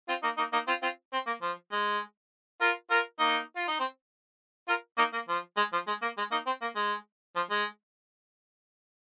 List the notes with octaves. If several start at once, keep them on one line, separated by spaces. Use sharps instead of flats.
C4 F4
A#3 D#4
A#3 D#4
A#3 D#4
C4 F4
C4 F4
C4
A#3
F3
G#3
F4 A#4
F4 A#4
A#3 D#4
F4
D#4
C4
F4 A#4
A#3 D#4
A#3
F3
G#3
F3
G#3
A#3
G#3
A#3 D#4
C4
A#3
G#3
F3
G#3